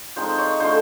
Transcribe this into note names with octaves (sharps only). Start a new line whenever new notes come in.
F3 G#3 C4 D#4 C5
C#5
D3 F3 A3 C#4 C5